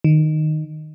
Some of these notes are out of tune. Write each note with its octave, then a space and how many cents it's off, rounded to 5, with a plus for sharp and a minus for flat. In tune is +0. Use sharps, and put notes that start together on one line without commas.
D#3 -10